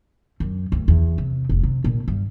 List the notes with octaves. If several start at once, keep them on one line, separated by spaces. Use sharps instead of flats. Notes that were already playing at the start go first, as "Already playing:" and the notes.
F#2
D2
E2
C3
F1
C3
A#2
G2